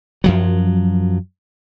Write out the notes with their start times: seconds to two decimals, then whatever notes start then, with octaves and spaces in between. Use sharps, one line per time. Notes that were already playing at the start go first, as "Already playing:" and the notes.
0.24 F#2 F3 F#3